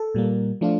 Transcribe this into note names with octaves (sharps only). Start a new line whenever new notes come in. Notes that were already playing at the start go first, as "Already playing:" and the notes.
Already playing: A4
A#2 G3 A#3
F3 A3 D4 F4